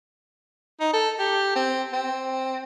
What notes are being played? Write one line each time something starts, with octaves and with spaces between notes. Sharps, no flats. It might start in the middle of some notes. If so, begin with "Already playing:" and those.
D#4
A4
G4
C4
C4